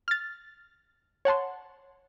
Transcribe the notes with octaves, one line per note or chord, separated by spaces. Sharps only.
F6 A6
C#5 F#5 A5 C6